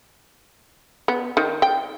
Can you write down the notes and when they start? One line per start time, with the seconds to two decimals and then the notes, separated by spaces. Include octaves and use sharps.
1.08 B3
1.37 D#3
1.62 G5